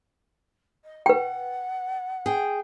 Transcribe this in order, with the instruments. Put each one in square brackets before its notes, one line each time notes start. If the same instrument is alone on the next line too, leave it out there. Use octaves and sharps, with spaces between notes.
[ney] D#5
[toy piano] B4 G5 [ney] F#5
[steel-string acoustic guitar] G#4 G5